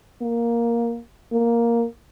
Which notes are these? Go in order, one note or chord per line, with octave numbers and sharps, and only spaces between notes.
A#3
A#3